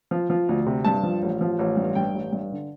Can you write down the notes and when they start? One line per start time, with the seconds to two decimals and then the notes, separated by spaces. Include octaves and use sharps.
0.11 F3
0.30 F3
0.49 D2
0.66 C3
0.84 G2 A5
1.03 F3
1.22 A1
1.41 F3
1.59 A1
1.77 G2
1.95 G2 G5
2.15 A1
2.32 G2
2.52 D3